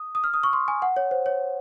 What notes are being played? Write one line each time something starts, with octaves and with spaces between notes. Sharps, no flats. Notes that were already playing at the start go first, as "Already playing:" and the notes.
Already playing: D#6
D#6
F6
D#6
C#6
C6
G#5
F#5
C#5
C5
C#5